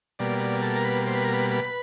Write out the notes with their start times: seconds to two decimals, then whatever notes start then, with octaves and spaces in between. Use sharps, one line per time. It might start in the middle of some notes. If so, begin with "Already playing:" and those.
0.19 B2 G3 A#3 D5
0.40 D5
0.62 A4
0.76 A#4
0.84 B4
1.07 C5
1.15 B4
1.24 A#4
1.34 B4
1.51 B4